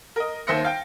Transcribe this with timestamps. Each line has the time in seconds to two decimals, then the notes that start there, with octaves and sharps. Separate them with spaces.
0.16 A#4 D#5
0.47 D#2 C5 E5 C6 A#6 C#7
0.64 F5 G5